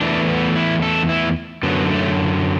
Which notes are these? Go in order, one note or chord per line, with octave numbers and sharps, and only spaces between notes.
E2 E3 A3 D4
B3
E4
A4
E4
F#2 D3 F#3 B3
A3